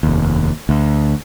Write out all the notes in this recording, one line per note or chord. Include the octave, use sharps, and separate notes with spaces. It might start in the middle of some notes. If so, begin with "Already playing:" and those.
F1 D#2
D2